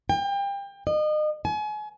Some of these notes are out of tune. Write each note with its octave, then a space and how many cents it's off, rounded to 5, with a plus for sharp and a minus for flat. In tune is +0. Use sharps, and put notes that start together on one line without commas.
G5 +30
D#5 -35
G#5 +35